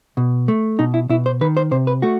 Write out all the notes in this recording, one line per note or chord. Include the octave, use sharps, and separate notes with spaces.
B2
A3
B2 D#4
E4
B2 E4
C5
D#3 B4
C5
C3 C5
B4
A3 F#4